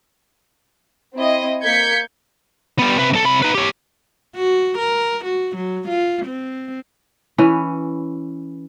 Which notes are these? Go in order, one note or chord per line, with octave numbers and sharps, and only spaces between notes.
C4 E4 D#5
A#3 G6 G#6 B6 C#7
G3 B3
C3 B4
B1 A4
C3 B5
D#4 B4
G4 C#5
F#4
A#4
F#4
F#3
F4
C4
E3 C#4 B4